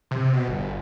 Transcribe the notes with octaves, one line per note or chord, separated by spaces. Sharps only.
C3
B2
G1